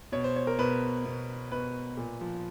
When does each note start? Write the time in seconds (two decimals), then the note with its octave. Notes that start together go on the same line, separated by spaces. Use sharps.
0.12 B2 C#5
0.24 C5
0.36 C#5
0.47 A#4
0.59 B2 B4
1.05 B2
1.52 B2 B4
1.97 A#2
2.21 F3